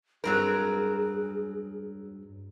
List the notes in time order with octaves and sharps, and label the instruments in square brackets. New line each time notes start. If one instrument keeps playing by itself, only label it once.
[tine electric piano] G2 B4 [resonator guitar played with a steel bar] F#3 C4 A#4 [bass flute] G#4